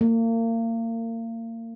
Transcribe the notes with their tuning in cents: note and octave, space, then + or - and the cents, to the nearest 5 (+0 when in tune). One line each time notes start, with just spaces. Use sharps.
A#3 -35